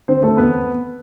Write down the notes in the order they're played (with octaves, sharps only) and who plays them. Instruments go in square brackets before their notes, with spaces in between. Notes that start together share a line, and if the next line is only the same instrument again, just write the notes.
[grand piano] D3 C4 C5
A3 C4 A4
E2 B3 B4